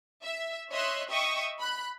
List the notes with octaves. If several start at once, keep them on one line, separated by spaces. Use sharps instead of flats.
E5
C#5 D#5 E5 C6 F#6
D#5 E5 G5 C#6 D#6
B5 F#6